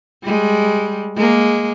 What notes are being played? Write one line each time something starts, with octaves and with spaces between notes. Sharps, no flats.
G3 G#3
G#3 A#3